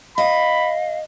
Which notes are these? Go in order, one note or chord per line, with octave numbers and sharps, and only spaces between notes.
D#5 F5 B5